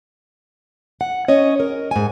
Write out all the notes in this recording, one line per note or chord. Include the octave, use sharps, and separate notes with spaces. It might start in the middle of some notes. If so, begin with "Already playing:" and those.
F#5
C#4 C#5 D#5
A#4
G#2 G#5